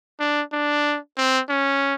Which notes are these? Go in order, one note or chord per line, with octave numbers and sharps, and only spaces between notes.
D4
D4
C4
C#4